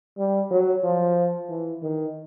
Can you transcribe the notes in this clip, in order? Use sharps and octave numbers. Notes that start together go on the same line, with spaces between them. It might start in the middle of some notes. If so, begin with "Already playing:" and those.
G3
F#3
F3
E3
D#3